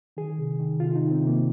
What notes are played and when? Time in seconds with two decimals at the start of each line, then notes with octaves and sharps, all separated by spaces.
0.17 D#3 G#4
0.38 C3
0.59 D#3
0.80 C3 F4
0.95 D#4
1.01 D#3
1.11 C4
1.22 C3
1.27 A#3